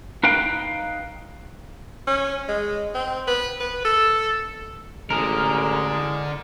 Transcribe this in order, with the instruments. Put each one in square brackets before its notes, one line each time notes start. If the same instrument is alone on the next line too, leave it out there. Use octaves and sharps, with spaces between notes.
[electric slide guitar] D#4 B4 F5 G5
[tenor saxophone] C#4
G#3
C4
B4
B4
A4
[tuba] A1 [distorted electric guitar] D3 [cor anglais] G#3 [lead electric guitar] A#4